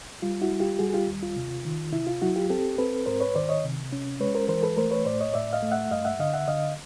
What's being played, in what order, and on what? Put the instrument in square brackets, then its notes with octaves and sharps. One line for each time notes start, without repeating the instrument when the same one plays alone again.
[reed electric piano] G3 F4
E4 F#4
G3
F4 G4
G3 F#4 G#4
G#4
F4 G4
D#2
F4
C3
D#3
C3 E4
F4
F#3 E4 F#4
F4 G4
C4 G4 A4
C4 A4 B4
G#2 A#4 C5
B4 C#5
D#3 C5 D5
C#5 D#5
C3
C#4
G#3 B4 C#5
A#4 C5
E3 A#4 C5
A4 B4
A3 A#4 C5
B4 C#5
A2 C5 D5
C#5 D#5
A2 D5 E5
D#5 F5
A3
E5 F#5
G2 D#5 F5
E5 F#5
D3 D#5 F5
E5 F#5
D3 D#5 F5